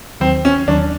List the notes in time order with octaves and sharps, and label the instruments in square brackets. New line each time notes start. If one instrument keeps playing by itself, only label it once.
[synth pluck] D#2 D#3 F#3 [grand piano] C4
[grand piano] C#4
[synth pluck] D#2 D#3 F#3 [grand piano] D4